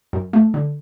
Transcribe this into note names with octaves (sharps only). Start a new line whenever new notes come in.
F#2
A3
D3